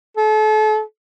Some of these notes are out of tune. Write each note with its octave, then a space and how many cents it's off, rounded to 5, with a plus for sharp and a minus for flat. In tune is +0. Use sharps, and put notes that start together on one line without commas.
A4 -35